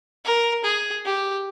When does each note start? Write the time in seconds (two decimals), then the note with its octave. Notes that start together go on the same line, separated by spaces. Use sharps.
0.25 A#4
0.64 G#4
1.05 G4